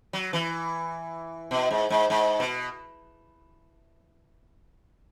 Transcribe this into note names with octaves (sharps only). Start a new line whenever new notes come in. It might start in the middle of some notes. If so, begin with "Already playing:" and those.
F#3
E3
B2
G#2
G#2
G#2
B2